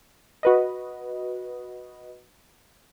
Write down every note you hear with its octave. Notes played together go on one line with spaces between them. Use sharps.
F#4 B4 D#5